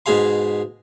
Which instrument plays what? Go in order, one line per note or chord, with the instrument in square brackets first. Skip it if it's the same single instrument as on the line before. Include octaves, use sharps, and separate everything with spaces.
[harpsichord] G#2 B2 G#4 F5 C6